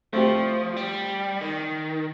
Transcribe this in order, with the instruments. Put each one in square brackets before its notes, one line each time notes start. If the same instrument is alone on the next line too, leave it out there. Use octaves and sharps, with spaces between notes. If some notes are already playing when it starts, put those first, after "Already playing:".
[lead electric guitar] F3 [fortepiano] A3 C4 G4
[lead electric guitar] G3
D#3